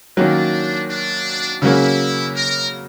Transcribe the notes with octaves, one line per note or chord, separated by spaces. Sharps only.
D#3 F#3 A#3 C#4 D4
D4
C#3 F#3 A#3 C#4 E4
A#4